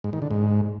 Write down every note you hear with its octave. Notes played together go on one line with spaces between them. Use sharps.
G#2
D#3
D3
G#2